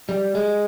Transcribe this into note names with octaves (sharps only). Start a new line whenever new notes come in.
G3
G#3